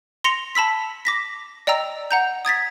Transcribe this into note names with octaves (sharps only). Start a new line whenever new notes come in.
C6 A#6 C#7 F7
A5 B5 E6 B6
D6 A#6 B6
D5 D#5 G5 A#5 E6
F#5 A#5 G6
D#6 G#6 A6 B6